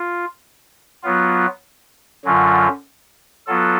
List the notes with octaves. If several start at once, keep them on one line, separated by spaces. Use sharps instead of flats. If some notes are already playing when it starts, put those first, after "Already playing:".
Already playing: F4
F#3 B3 F4
F#2 D3 F#3 C#4 F4
F#3 B3 F4 A4